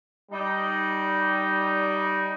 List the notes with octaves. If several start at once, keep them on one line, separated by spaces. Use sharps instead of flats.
G3 D#4